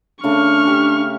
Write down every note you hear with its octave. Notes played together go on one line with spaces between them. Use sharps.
C#3 A3 D4 C#6 F6
G4